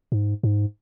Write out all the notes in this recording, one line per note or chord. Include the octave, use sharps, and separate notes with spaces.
G#2
G#2